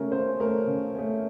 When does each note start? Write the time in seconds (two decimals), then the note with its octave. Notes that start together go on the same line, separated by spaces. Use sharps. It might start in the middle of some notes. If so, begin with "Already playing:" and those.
Already playing: C#3 A3 C#4 A#4
0.12 C#3 C5
0.40 A3 C#4 A#4
0.67 C#3
0.95 A3 C#4